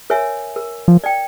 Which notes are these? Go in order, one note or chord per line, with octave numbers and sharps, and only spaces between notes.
A#4 C#5 E5 G#5
A#4
F3
D5 G5